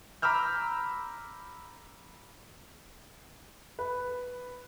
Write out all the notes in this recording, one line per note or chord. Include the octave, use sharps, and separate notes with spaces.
A#5 B5 D6 E6 F6 G6
B4